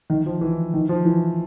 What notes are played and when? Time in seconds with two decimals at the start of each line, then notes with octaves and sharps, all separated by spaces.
0.10 D#3
0.26 F3
0.41 E3
0.74 D#3
0.89 F3
1.05 E3